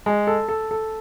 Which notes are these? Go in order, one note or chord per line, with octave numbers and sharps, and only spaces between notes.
G#3
A4
A4
A4